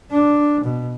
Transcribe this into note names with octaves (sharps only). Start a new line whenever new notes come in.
D4
B2